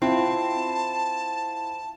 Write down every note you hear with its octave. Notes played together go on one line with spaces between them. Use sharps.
C4 E4 F4 A5